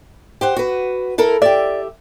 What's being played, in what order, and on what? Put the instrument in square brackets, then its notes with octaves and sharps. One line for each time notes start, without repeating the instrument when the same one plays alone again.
[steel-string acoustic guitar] G4 C5 F#5
F#4 B4
E4 A4 A#4
[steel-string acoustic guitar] G4 E5 [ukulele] D5